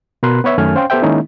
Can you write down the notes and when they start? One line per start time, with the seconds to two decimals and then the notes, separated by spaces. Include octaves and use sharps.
0.23 B2 A#4 B5 C6 F#6
0.44 B3 B4 C#5 E5
0.58 F#2 D#3 A3 C#4 G#5 F6
0.75 C#4 C5 F5 G5 C6
0.90 B3 G4 A4 C5 E5 G5
1.02 D#3 G#3 A#3 C#4 D#4 E4